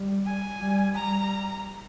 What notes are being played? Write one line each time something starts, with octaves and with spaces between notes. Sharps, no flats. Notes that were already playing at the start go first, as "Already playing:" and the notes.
Already playing: G3
G#5
G3
G3 A#5